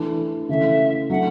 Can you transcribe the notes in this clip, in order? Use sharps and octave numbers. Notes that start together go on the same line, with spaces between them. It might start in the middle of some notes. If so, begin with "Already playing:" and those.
Already playing: E3 A3 D4
C#3 E3 A3 E5
F#3 A3 D4 F#5